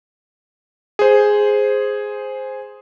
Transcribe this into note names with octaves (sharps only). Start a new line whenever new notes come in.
G#4 C5